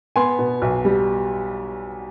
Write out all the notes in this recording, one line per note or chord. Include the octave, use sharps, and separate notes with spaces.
B3 G#5 C6
B2
B1
G3